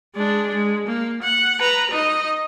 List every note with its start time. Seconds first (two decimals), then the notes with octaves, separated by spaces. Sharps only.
0.15 G#3 D4
0.54 G#3
0.86 A#3
1.22 F#5
1.60 B4 A#5
1.91 D#4 D#5